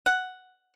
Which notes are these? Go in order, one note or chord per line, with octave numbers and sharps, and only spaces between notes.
F#5